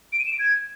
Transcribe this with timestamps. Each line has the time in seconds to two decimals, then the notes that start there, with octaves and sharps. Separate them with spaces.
0.13 D7
0.19 D#7
0.26 E7
0.33 D7
0.39 G#6